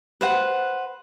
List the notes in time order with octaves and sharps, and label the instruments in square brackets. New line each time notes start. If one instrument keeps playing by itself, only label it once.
[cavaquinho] B4 C5 F#5